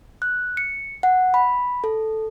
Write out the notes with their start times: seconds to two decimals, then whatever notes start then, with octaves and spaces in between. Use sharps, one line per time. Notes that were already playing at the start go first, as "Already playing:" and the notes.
0.22 F#6
0.57 C#7
1.03 F#5
1.34 B5
1.84 A4